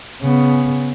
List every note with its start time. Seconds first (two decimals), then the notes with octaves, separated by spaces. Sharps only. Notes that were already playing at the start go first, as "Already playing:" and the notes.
0.22 C#3 B3